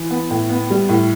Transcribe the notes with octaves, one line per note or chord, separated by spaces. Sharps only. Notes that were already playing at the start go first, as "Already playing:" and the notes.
Already playing: E3
B3
A2
B3
G3
A2